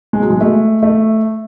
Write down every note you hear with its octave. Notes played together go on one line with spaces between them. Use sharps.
G#3
F#3
G#3
A3
A3